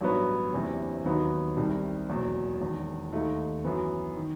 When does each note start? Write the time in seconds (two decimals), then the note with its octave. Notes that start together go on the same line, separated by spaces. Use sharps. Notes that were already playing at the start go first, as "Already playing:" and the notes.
0.01 A1 G2 F#3 B3
0.52 F#1 E2 C3 E3
1.05 D#2 D#3 F#3 B3 D#4
1.56 C2 C3 D#3 G3
2.09 F#1 E2 B2 F#3
2.60 E1 E2 D#3
3.13 D#2 D#3 A3 D#4
3.64 F#2 E3 B3
4.16 D#3